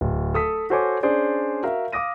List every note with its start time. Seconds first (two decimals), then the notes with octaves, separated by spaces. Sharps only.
0.01 D1
0.34 A4 D#6 B6
0.70 F#4 A4 C5 C#5 G#5 D6
1.03 C#4 D4 G#4 C5 D5
1.63 F#4 A#4 E5 F5
1.92 F5 D6 D#6 A#6 D#7